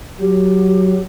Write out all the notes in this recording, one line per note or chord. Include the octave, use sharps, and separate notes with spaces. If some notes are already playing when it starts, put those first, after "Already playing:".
F#3 G4